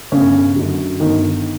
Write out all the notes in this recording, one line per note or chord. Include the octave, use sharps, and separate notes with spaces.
G1 C#3 C#4
F#2 D3 F#3
G1 D#3 D#4